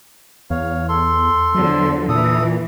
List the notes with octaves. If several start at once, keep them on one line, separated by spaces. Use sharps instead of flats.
E2 C#5 F5
A4 C6
E2 D3 F3 F#3
A#2 E3 A4 D#6